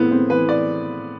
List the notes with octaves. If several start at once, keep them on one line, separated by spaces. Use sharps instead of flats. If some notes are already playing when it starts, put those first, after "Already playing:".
Already playing: A2 E3 B3 C4
C4
E3 B4
D5